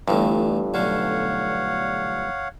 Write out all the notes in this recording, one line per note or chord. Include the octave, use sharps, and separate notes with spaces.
G1 G2 E3 A3
B1 D3 A3 C#5 F5 F#5